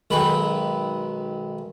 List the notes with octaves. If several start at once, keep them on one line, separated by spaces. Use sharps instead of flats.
B1 D#3 G#3 B3 B4 B5